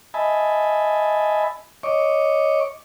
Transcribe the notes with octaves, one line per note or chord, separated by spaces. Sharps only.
D#5 E5 G#5 A5 B5
C#5 D#5 C#6 D6